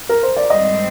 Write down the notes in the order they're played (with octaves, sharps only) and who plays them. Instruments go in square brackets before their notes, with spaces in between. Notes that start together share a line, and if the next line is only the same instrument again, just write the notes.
[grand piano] A#4
C5
D5
[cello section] G#2 D#3 G3 C4 [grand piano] D#5